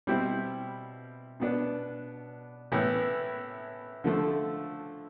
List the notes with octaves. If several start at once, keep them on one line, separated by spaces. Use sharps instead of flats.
B2 G3 C4 E4
B2 B3 D4
A2 E3 B3 E4
D3 F3 A3